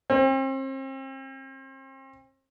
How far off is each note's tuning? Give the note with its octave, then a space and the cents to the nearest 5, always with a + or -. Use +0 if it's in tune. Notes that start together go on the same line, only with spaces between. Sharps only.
C4 +40